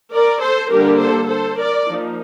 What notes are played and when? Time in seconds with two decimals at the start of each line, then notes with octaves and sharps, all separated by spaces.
0.14 A#4 D5
0.42 A4 C5
0.71 D3 G3 A#3 D4 G4 A#4
1.01 A4 C5
1.30 A4 C5
1.59 A#4 D5
1.89 F3 A#3 D#4